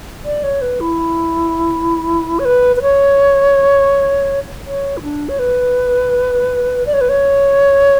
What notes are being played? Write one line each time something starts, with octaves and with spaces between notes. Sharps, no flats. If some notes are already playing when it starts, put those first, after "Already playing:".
D5
C#5
B4
E4
C#5
B4
B4
C#5
C#5
E4
D4
C#5
B4
D5
C#5
B4
C#5